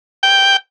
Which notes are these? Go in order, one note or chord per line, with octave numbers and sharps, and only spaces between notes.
G5